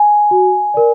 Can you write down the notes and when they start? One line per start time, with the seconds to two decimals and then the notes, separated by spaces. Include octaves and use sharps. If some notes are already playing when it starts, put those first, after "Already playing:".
Already playing: G#5
0.31 F#4
0.74 A#4 D5